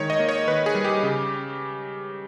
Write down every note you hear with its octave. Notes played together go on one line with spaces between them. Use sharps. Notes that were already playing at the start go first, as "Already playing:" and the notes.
Already playing: D#3 G#3 C#5
D#5
A#3
C#5
D#3 B4
G#4
G3
G4
C#3